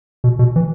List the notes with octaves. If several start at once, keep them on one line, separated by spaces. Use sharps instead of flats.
B2
B2
E3